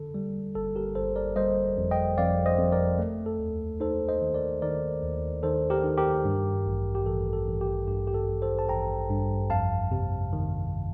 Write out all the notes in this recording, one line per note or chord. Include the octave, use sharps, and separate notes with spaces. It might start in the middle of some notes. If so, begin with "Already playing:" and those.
Already playing: D3 A4
G3
G1 A4
G4 A#4
G1 A4 C5
A#4 D5
G3 C5 D#5
F2
D#5 G5
F2 D5 F5
C5 D#5
F2
A#4 D5
A3
A4
D#2
D#4 A4 C5
C5 D#5
D#3
A#4 D5
D#3 A#4 D5
D#2
D#3 A4 C5
G4 A#4
D#3
G4 A#4
G2
A1
G4
A1 A4
A4
A1
G4
G2 G4
G4
A4
A1
A4 C5
A5
A1 G5 A#5
G2
F2 F5 A5
C3
D#3